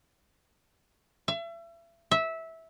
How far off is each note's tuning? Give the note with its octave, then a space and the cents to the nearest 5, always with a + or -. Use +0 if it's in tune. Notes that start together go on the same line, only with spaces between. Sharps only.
E5 +35
E5 -15